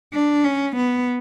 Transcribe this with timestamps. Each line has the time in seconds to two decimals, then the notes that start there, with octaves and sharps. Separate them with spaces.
0.13 D4
0.44 C#4
0.76 B3